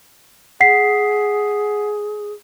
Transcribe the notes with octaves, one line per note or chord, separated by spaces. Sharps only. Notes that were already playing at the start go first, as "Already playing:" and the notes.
G#4 F#5 B6 C7